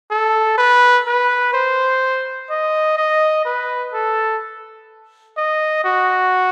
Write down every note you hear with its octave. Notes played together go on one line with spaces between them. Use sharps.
A4
B4
B4
C5
D#5
D#5
B4
A4
D#5
F#4